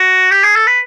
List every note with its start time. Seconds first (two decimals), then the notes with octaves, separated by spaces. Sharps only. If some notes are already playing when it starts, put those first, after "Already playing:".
Already playing: F#4
0.31 G4
0.43 G#4
0.56 A4
0.67 B4